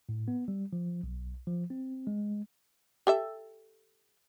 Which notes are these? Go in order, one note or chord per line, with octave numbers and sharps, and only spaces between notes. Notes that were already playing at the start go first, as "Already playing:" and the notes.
A2
B3
G3
F3
B1
F3
C4
G#3
G4 A4 E5